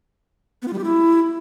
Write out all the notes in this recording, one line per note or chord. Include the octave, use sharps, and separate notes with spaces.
B3
F4
G3
G4
E4